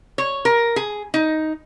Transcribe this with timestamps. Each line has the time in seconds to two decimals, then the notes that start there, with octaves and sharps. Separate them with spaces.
0.18 C#5
0.45 A#4
0.76 G#4
1.14 D#4